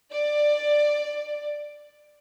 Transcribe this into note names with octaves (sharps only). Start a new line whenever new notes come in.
D5